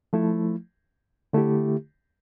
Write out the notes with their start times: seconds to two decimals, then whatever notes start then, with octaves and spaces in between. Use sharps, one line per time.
0.13 F3 A3 E4
1.33 D3 A3 E4 G4